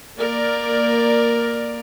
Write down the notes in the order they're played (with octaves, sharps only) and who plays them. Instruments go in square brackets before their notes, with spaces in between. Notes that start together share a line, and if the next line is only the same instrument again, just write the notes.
[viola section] A#3 A#4 D5